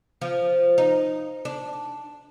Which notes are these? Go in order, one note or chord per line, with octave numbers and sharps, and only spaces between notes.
F3
D#4
D4